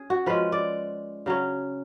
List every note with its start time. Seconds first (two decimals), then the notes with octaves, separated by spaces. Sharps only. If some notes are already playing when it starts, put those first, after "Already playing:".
Already playing: C#4 G#4
0.10 F#4
0.26 F3 G#3 C#4 B4
0.52 D5
1.26 C#3 F#3 C#4